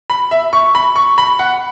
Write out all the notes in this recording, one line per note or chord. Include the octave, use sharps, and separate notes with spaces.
B5
E5
C#6
B5
C#6
B5
F#5